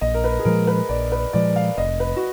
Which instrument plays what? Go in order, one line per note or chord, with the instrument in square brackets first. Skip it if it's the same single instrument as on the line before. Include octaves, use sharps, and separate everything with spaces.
[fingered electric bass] A#1 [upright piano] D#5
[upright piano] A#4
B4
G#4
[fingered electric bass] A#2 F3 G#3 [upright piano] A#4
[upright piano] B4
[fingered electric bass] A#1 [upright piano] D5
[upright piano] B4
[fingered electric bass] A#2 F3 G#3 [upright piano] D5
[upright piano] F5
[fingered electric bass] F1 [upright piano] D#5
[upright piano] B4
F#4